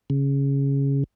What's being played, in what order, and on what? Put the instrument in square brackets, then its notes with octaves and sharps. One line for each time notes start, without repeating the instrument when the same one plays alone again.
[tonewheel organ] C#3